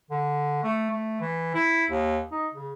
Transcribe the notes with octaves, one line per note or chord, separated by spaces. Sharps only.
D3
A3
A3
E3
E4
D#2
D#4
C#3